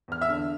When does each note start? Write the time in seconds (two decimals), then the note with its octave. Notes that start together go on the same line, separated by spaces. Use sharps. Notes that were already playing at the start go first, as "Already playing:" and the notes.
0.08 E2 F6
0.21 E5 E6
0.29 D3